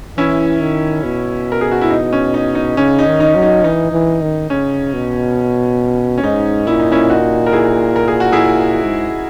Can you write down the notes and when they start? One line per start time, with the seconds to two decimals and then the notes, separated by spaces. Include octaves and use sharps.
0.17 E3 C#4 E4
0.61 D#3
1.04 B2
1.52 A#4
1.61 G#4
1.71 F#4
1.81 E4
1.90 D#4
2.13 C#4
2.34 D#4
2.55 D#4
2.77 C#3 C#4
2.99 D#4
3.06 D#3
3.20 D#4
3.35 F#3
3.42 D#4
3.64 E3 D#4
3.92 E3
4.21 D#3
4.50 C#3 C#4
4.93 B2
6.18 C#4
6.23 G#2 D#4
6.67 A#2 E4
6.79 D#4
6.92 C#4 E4
7.10 D#4 F#4
7.46 A#4
7.52 E4 G#4
7.96 A#4
8.08 G#4
8.20 F#4
8.32 E4 G#4
8.83 G#2